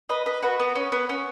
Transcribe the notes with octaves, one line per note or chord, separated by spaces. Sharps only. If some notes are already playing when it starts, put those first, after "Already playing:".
B4 D#5
B4 D#5
F#4 B4
B3
C#4
B3
C#4